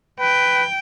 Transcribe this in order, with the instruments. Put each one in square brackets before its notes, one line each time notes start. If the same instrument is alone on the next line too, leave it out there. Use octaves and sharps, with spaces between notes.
[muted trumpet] B4 [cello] G5